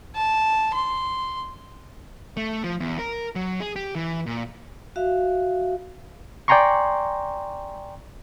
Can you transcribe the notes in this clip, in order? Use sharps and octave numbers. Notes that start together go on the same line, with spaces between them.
A5
C6
A3
F3
E2
A#4
F#3
G#4
G4
E3
A#2
F#4 E5 F5
D5 G5 G#5 A#5 C6 C#6